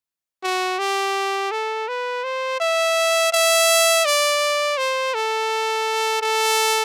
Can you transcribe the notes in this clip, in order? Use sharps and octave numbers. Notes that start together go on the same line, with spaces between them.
F#4
G4
A4
B4
C5
E5
E5
D5
C5
A4
A4